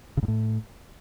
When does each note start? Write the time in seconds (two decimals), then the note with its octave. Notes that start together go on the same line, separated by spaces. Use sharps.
0.17 C#3
0.23 G#2
0.28 A2